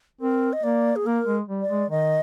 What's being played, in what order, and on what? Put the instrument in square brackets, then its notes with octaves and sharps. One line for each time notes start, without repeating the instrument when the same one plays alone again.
[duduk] C4 [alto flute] A#4
[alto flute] D#5
[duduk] A#3 [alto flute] D5
[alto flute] G#4
[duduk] A#3 [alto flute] A#4
[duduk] G#3
G3
[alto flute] D5
[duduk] G#3
[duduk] D#3 [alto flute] D#5